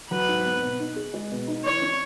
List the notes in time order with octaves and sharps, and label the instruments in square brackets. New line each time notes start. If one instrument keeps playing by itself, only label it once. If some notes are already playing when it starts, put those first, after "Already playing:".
[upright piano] F#3 [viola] B4
[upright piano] G#2
B3
B2
D#4
G#4
G#3
B2
D#4
[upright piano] E3 [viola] C#5
[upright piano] C#4